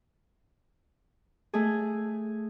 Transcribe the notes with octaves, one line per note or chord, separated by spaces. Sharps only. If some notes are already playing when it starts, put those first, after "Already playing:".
A3 G#4